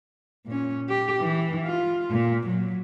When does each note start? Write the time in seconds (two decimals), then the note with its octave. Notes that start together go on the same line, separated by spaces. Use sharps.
0.47 A#2 C#4
0.90 G4
1.20 E3
1.65 F4
2.11 A#2
2.47 F#3